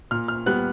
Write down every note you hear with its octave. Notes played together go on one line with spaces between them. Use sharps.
A#2 F6
F6
G3 B3 F#6